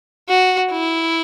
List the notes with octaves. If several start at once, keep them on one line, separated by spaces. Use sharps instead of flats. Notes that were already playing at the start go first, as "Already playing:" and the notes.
F#4
E4